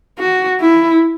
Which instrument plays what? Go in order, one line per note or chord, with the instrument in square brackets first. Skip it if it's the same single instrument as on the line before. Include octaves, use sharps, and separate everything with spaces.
[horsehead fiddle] F#4
E4